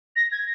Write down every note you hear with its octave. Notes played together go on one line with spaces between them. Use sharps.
A#6
G#6